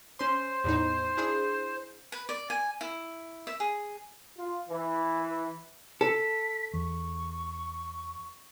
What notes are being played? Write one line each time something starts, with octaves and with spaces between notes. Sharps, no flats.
C#4 C5 C6
E2 A2 D#4
D4 E4 G#4
B4
D5
G#5
E4
E5
G#4
F4
E3
A4 B6
E2 C#6